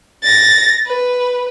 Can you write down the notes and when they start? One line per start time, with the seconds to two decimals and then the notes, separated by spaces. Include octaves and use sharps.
0.23 A6 A#6
0.86 B4